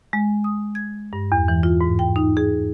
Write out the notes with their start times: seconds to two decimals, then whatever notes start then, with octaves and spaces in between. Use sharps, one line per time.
0.13 G#3
0.44 D#6
0.75 G#6
1.13 G2
1.32 E2
1.48 E3
1.63 F4
1.81 G#2
1.99 G5
2.16 D#4
2.37 G#4